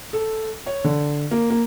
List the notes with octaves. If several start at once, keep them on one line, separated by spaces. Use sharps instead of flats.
A4
C#5
D3
A#3
A#3